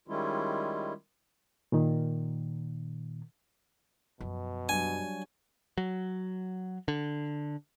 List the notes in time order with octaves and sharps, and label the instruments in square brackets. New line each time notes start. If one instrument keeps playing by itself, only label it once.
[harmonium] D#3 G3 G#3 C#4 E4 F4
[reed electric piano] A#2 D#3
[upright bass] F#2 F3 [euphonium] B2
[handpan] F#3 G3 D4 [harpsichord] G#5
[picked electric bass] F#3
D3